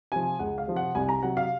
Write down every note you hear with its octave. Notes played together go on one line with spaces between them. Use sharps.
C3 F3 G#5
C#2 F#5
F5
C3 F3
F#5
C2 G#5
A#5
C3 F#3 F#5
F5